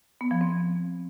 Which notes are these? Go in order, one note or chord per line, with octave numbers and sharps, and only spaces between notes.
B3
F3
C4